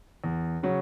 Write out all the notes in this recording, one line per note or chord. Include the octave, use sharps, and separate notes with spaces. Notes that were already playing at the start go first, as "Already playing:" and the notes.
E2
C#3 F#3 C#4